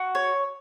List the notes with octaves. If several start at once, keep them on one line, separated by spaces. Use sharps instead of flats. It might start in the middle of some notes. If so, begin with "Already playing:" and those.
Already playing: F#4
C#5